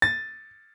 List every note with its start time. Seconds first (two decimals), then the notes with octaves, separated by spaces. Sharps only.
0.02 A6